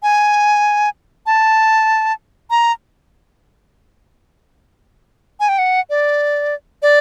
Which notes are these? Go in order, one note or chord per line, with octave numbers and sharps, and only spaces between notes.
G#5
A5
A#5
G#5
G5
F#5
D5
D5